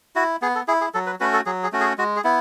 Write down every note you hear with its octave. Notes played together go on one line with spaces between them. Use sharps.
E4 F#4
B3 G#4
A4
E4 G#4
G#4
F#3 A4
B4
A3 C#4 F#4 B4
A4
F#3 G#4
G#4
A3 C#4 F#4
G#4
G#3 F#4
G#4
B3 E4